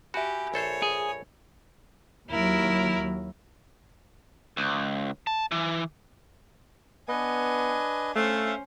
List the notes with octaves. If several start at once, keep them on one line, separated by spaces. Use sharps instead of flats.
F#4 G4 E5 G#5 B5
A#1 A4 C5 C#5
G#4
D#2 F#3 E4 A#4
C#2
A5
E3
B3 D4 B4 D#5 G#5
A3 C#4 C5 E5 F5